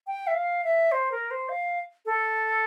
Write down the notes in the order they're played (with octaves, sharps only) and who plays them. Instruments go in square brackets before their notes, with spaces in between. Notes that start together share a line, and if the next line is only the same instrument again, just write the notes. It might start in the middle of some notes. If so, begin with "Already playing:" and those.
[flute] G5
E5
F5
E5
C5
A#4
C5
F5
A4